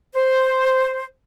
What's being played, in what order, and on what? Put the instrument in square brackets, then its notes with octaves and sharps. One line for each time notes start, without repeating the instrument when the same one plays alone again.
[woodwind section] C5